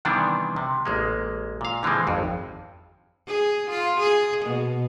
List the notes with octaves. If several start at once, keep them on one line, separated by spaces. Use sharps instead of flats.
C3 D#3 E3 G3 B3 D4
C3
A1 G#3 A#3
A#2 F5
D3 E3 F3 G#3 C4
G#1 F2
G#4
F4
G#4
B2